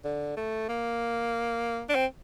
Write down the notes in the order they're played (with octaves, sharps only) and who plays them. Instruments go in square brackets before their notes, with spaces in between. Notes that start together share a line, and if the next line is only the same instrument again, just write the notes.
[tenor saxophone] D3
A3
A#3
D4
C4